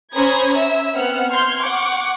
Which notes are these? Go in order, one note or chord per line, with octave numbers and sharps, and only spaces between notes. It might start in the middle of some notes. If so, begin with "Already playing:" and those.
C#4 C5 A#5 B5 D#6 G#6
E5 E6
B3 C4 F#5 F6
C6 F6 G6 G#6
F#5 C#6 D6